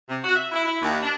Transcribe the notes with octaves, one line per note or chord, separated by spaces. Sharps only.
C3
F#4
E5
E4
E4
D#2
D4